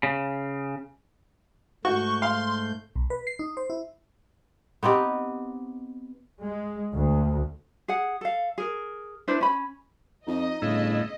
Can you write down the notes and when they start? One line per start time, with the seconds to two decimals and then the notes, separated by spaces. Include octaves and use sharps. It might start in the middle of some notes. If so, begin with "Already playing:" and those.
0.03 C#3
1.85 G#2 A3 F#4 C#6 G6
2.22 F5 C6
2.96 B1
3.10 B4
3.27 C7
3.39 D#4
3.57 C5
3.70 E4
4.83 B3 C4 D#4 G4
6.43 G#3
6.94 D2
7.88 G#4 F#5
8.21 A4 F5
8.58 G#4 A#4
9.28 D4 E4 B4 C5
9.41 C#4 B5
10.27 F2 D#4 D#5
10.62 G1 A2 C#3 E4